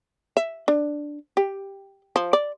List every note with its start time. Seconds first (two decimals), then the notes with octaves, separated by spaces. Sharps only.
0.37 E5
0.68 D4
1.37 G4
2.16 F3
2.33 D5